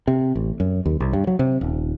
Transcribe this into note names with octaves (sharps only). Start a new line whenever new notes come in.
C3
A1
F#2
D#2
C2
G2
F#3
C3
D#1